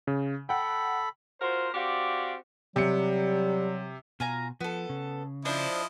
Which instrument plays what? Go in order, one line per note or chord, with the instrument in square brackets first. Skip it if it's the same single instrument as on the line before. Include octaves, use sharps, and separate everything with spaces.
[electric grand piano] C#3
[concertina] A4 B5 [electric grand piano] F#5 G5
[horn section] F4 F#4 A#4 C5
C4 F#4 G4 D5 F5
[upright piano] C3 C#7 [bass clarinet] F#3 [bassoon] G3
[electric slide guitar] B2 [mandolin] F4 G#5 A#5
[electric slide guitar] F3 [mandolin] B3 A4
[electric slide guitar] C#3
[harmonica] F3 E4 D#5 [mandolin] D4 C5